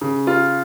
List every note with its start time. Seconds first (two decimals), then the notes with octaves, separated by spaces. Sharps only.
0.01 C#3
0.27 F4